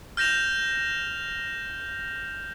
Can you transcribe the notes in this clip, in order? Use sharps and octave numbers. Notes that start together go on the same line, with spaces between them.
F6 G6 A#6 E7 F7